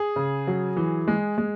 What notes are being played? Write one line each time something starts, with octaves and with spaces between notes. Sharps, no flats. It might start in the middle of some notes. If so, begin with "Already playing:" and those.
Already playing: G#4
C#3
F#3
E3
G#3
G#3